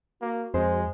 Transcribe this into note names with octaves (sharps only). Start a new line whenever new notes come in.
A#3 F#4
F2 G#3 C5